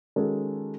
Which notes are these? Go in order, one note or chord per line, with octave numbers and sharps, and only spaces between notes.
D#3 G#3 C#4 F#4 A4